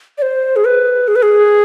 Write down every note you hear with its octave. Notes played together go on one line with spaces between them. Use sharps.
D5
C5
G#4
B4
G#4
B4
G#4